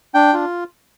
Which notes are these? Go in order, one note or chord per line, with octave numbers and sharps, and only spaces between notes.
D4 G5
F4